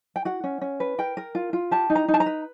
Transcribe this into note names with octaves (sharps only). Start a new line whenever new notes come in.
G5
F#4 F#5
C#4
C#4
B4
A#4 G5
A#4
F4
F4
G4 A5
D#4
A#5
D#4
A5
A#5
B4